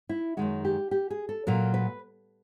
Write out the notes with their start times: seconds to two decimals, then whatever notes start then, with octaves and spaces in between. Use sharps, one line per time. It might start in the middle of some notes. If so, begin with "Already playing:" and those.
0.09 E4
0.37 F#2 D#3 G#3 F#4
0.65 G4
0.91 G4
1.10 G#4
1.29 A4
1.47 A#2 F#3 A#4
1.74 B4